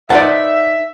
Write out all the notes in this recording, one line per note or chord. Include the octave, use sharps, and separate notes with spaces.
D#4 B4 C5 D5 E5 F#5 A5